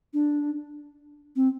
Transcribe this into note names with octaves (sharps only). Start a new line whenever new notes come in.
D4
C4